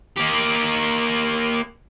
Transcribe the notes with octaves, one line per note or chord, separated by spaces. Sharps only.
A#3 G4